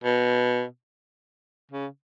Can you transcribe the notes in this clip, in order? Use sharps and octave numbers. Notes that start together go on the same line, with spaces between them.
B2
C#3